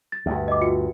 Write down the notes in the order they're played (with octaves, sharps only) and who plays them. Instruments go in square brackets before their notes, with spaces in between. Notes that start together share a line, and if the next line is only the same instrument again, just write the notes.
[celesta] A6
[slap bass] D2 G2
[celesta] D#5 D6
F4 F#4 C#7